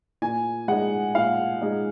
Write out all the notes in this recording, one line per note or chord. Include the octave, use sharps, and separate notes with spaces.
A#2 G#5
G#3 D#4 F#5
A#2 F5
G#3 D#4